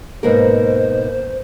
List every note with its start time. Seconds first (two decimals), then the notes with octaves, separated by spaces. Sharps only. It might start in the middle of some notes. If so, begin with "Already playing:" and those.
0.23 G#2 B2 A#3 A#4 C5